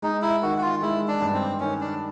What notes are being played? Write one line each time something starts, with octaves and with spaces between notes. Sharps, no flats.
G#3 D#4
E4
D#3 F#4
F#4
F4
G#3 E4
D4
G2
C4
D#3 C#4
D4